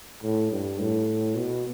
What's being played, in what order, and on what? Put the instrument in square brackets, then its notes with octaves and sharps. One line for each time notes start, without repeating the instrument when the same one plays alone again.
[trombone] A2
G2
A2
B2